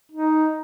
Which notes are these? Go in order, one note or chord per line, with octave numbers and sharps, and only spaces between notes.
D#4